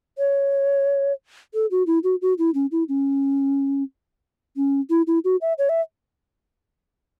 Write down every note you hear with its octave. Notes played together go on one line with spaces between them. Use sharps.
C#5
A4
F#4
E4
F#4
F#4
E4
C#4
E4
C#4
C#4
E4
E4
F#4
E5
C#5
E5